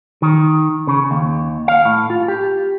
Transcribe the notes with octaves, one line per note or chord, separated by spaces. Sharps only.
D#3
C#3
D#2
F5
A2
F4
G4